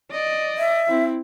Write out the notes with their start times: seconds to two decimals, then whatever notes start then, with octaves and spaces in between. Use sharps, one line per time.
0.11 D5 D#5
0.58 E5
0.88 C4 E4